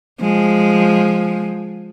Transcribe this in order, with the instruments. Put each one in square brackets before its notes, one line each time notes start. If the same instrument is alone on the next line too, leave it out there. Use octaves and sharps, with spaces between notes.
[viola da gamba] F3 G#3